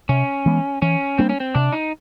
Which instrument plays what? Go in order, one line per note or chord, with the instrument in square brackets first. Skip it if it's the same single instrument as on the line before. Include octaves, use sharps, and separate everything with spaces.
[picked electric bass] C3 [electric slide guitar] C#4
[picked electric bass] E3 G#3 B3
[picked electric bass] E3 [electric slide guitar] C#4
[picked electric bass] G3 A#3 D4 [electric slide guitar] C4
[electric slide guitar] C#4
C4
[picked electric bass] C3 [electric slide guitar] D4
[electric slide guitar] D#4